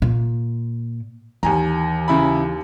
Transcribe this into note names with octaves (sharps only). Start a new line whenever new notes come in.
A#2
D#2 E3 G#5 A#5
C#3 E4 B5